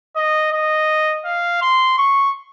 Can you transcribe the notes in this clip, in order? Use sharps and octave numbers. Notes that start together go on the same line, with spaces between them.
D#5
D#5
F5
C6
C#6